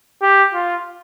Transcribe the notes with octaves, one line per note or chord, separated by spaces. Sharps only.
G4
F4